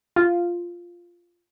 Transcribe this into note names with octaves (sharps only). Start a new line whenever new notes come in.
F4